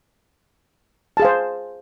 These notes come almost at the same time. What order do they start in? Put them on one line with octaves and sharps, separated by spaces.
A5 G#4 F5 C5